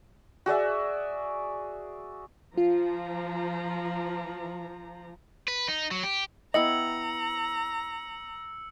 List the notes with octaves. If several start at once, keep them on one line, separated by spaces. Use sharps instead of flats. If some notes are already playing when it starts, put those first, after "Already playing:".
F#4 G#4 D5 E5
F3 F4 A#5
B4
D#4
F#3
G4
B3 E4 D#5 G5 A#5 E6 C#7 F#7